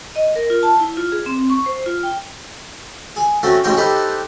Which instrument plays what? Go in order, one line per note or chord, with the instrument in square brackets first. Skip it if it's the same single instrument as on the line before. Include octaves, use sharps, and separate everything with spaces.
[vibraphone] D#5
A#4
F4
A5
E4
F4
G#4
C4
C#6
C5
F4
G5
[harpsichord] G#4
A3 C4 C#4 F#4
A1 G#2 F#3 C5 C#5 G5
D#4 G4 A4 B4 C5